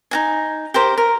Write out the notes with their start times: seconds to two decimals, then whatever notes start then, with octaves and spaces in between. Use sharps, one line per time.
0.11 D#4 F#4 G#5
0.74 G4 A#4 C5
0.98 A#4